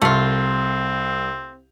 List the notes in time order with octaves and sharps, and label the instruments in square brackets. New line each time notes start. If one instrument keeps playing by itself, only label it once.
[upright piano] C2 [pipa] A3 F4 [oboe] C4